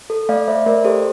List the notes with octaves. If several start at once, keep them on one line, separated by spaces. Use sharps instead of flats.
A4
A3 D5 F5
A3 C5 E5
A3 A#4 D5
G4 A4 C5